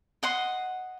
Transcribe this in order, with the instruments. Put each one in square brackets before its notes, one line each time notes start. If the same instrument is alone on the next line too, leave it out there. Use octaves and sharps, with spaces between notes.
[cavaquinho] D#5 F#5 C6